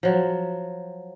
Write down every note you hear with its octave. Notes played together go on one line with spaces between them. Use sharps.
F3 F#3